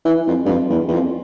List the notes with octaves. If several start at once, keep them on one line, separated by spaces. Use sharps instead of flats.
E3
F2
G2
F2
E2
E2
F2